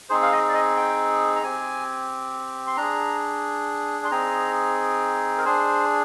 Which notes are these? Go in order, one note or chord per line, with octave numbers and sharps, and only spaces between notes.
C4 D#4 G#4 C5
F5
D#5
D5
D#5
G5
A#5
C4 G4 G#5
C6
D4 G#4 A#5
C6
C4 D#4 G#4 A#5
A#4
D4 G#4 C5